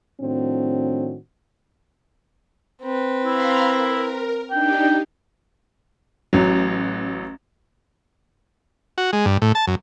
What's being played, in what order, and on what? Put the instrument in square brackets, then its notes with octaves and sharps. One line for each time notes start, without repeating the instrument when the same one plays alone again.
[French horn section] A2 D#3 F3 C4 D4 F#4
[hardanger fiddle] C4 B4
[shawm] E4 [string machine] F5 A#5 C6
[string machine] A#4
[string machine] D4 D#4 G4 [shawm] G5
[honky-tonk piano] A1 F#3
[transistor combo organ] F#4
G#3
G2
A2
A5
F#2